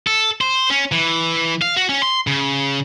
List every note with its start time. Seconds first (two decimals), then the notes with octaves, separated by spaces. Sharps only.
0.07 A4
0.41 C5
0.70 C#4
0.92 E3
1.62 F5
1.77 F#4
1.89 C#4
2.02 C6
2.27 C#3